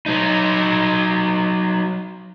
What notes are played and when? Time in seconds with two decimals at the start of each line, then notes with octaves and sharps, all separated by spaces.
0.06 F#3 D#4